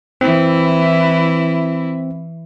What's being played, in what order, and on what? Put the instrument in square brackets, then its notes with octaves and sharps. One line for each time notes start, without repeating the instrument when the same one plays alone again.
[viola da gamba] E3 E4 [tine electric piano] C4